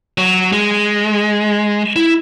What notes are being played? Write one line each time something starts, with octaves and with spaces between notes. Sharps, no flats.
F#3
G#3
E4